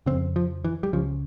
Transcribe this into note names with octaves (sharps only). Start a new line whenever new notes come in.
F2 C#3 C4
F3
E3
G3
C#2 C#3 F3